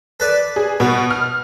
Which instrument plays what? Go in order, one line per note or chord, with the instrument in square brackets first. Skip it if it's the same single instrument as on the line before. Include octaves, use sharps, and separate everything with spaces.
[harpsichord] A4 B4 D5
[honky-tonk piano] G#4
[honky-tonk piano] B2 [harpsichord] B3
[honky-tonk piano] F6